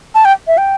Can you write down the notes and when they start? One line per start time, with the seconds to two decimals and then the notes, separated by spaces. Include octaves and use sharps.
0.15 A5
0.25 G5
0.47 E5
0.57 G5